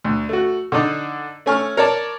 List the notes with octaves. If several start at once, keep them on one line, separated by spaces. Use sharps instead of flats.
D2
A3 F#4
D3 D4 D#4
A3 C#4 G#5 C#6 F6
A#4 C#5 D5 A5